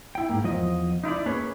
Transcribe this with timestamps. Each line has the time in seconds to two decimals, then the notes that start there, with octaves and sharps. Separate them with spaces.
0.15 E4 G5
0.29 G#2 A#3
0.43 E2 F3 D#5
1.04 D#4 E4 A#4 D5
1.26 A#3 C#4 G#4 B4 C#5